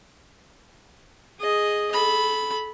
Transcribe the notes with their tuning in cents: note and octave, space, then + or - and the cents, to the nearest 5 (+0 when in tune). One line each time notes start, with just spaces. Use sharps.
G#4 +0 D#5 +0
A4 -30 B5 +0